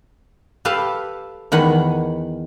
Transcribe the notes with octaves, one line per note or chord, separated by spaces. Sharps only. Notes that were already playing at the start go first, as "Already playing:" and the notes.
G4 A4 B4 F5 G5 A5
E2 D#3 F#5 G#5 B5